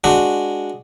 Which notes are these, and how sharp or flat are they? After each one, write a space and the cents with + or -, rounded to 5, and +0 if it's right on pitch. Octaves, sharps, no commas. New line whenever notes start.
G#3 +0 D4 +0 F#4 -5